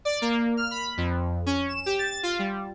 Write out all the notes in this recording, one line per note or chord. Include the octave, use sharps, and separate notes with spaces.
D5
A#3
F6
B5
F2
C#4
E7
G4
A6
F4
G3